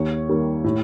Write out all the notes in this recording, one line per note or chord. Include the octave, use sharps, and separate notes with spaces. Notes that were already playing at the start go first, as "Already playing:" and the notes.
Already playing: D#2 C#5
D#3 G3 A#3
A2